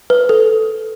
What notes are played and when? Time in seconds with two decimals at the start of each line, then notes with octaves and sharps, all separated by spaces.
0.10 B4
0.29 A4